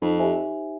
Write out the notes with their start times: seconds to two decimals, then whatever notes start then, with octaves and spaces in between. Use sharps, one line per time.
0.02 F2 D#4
0.19 G4 C5 E5 G#5